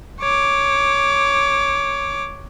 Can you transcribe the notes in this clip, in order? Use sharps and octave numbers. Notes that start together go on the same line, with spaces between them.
C#5 D6